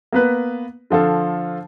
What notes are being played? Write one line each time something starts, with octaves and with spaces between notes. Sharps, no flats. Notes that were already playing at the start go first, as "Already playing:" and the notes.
A#3 B3 B4
D3 F3 F4 A4